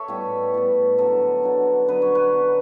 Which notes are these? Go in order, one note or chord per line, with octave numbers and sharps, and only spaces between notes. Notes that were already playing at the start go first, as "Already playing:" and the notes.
Already playing: A4 C#5 E5
A2 G3 B3 G4
A2 G3 B3
D3 F#3 B3 A4
D3 F#3 B3
D3 F#3 B3 B4
C#5
B4
D3 F#3 B3